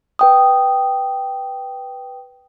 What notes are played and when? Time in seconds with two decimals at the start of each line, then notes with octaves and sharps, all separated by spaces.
0.19 B4 G5 D#6